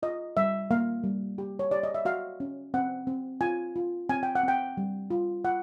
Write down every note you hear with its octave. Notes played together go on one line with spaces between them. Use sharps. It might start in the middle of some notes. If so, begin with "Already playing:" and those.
F4 D#5
G3 E5
A#3 F5
G3
G4
C#5
G4 D5
D#5
E5
F#4 F5
C#4
C4 F#5
C4
F4 G#5
F4
C4 G#5
G5
F#5
C4 G5
G3
F4
F4 F#5